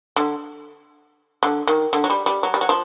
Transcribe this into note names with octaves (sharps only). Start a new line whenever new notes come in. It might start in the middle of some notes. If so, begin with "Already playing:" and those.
D3
D3
D#3
D3
F#3
G3
G3
F#3
G3
F#3
F3